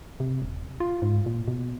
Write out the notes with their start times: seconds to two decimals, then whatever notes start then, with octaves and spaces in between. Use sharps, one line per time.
0.20 C3
0.42 D#1
0.80 F4
1.02 G#2
1.26 A#2
1.48 B2